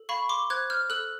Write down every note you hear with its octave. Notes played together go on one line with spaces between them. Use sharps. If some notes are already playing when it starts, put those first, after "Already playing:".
Already playing: A4
F5 B5 C#6
C6 D6
C5 F#6 G#6
F6 G6
A4 E6 F#6